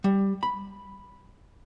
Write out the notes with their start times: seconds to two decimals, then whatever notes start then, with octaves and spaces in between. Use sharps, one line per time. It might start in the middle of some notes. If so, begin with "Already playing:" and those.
0.04 G3
0.43 B5